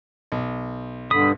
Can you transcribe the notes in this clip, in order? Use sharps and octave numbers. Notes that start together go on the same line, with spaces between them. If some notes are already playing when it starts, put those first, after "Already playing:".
B1
G2 D3 B5 D#6